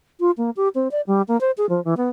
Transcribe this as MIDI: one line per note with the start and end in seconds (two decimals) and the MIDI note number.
0.20 0.31 65
0.37 0.50 58
0.57 0.68 67
0.75 0.88 60
0.91 1.01 74
1.07 1.22 55
1.28 1.39 58
1.41 1.51 72
1.57 1.66 68
1.69 1.83 53
1.84 1.94 52
1.97 2.10 59